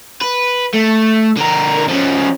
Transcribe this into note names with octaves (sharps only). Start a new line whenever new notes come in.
B4
A3
D3 A#4
F3 C#4